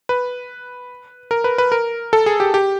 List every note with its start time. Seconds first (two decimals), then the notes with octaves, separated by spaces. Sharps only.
0.09 B4
1.31 A#4
1.44 B4
1.58 B4
1.72 A#4
2.13 A4
2.26 G#4
2.40 G4
2.54 G4